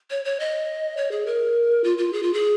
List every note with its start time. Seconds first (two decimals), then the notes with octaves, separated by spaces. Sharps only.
0.10 C#5
0.25 C#5
0.40 D#5
0.97 C#5
1.11 G#4
1.26 A#4
1.84 F4
1.98 F4
2.13 G#4
2.23 F4
2.34 G#4